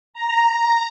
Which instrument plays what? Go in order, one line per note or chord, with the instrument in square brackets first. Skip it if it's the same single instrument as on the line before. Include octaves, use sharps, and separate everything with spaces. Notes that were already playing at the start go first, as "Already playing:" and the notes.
[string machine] A#5